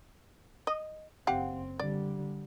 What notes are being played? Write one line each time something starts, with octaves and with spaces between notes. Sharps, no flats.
D#5
F#1 C4 G4 F5 F#5
D3 G3 D5